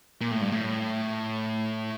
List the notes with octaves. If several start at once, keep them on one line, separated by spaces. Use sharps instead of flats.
A#2
A2
G2
A2